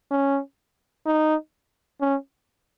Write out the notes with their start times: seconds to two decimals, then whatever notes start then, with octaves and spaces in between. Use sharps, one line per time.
0.11 C#4
1.06 D#4
2.01 C#4